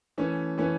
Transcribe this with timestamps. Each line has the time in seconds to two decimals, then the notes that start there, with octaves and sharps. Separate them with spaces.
0.18 E3 A3 C#4
0.58 E3 A3 C#4